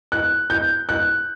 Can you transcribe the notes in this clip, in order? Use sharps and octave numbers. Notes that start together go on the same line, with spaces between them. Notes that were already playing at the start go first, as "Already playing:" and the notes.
F#6
G6
F#6